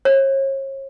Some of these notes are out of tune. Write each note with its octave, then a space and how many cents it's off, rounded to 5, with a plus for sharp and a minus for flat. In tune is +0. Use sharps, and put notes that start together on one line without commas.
C#5 -40